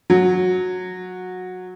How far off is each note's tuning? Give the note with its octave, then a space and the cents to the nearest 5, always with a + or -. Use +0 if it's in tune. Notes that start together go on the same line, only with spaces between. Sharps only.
F#3 -15